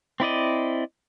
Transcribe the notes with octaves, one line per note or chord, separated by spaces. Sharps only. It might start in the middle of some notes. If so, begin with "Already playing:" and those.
C4 E4 D5 D#5